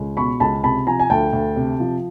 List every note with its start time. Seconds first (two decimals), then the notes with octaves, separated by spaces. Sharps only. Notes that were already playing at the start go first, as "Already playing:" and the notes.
Already playing: C#2
0.17 B2 B5 C#6
0.40 C#2 A5 B5
0.63 C3 A5 B5
0.87 F3 G#5 A#5
1.00 G#5
1.10 D2 G5 A5
1.33 D2
1.56 C3
1.80 F3